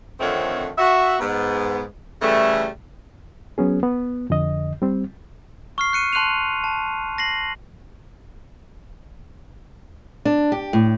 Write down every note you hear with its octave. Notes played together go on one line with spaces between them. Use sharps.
F2 D3 D#3 A3 C4 C#5
F#4 E5
G#2 B3
C#3 E3 G3 A3
F#3 B3 C#4 G#4
B3
F2 D3 D#5
G3 C4
C#6 F6 C7
F#6 C#7 D#7
A5 C6 F#6 C7 D#7 F7
A5
A#6 C7 F#7
D4
G4
A2